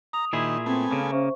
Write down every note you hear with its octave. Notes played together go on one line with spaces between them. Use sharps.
A#5 D#6 F7
A#2 D#3 E4 G#4
A3 B3 C4 G#5
C#3 A#3
C#4 C5 E5 C#6